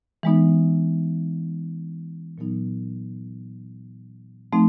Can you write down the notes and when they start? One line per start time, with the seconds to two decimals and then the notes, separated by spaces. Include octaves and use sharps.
0.23 E3 G#3 B3 D#4
2.38 A#2 F#3 B3 D#4
4.53 F3 A3 C4 D#4